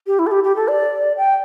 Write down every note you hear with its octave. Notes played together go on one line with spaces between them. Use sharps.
G4
E4
A4
G4
G4
A4
D5
G5